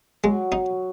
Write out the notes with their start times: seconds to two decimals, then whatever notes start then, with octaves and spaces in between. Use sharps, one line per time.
0.24 F#3 G#3
0.52 D#4